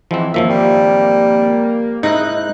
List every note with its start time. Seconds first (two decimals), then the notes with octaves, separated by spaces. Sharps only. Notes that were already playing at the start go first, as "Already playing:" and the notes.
0.11 G#2 E3 F3 C4
0.34 G#1 F#2 F3 A#3 E5
0.50 G3
2.03 G#2 D#4 E4 F#6